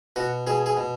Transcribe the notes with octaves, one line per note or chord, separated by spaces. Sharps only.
B2 F#4
B2 G#4
G#4
B2